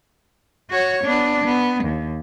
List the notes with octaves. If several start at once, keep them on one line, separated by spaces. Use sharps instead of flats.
F#4 C#5
B3 D4
B3
D#2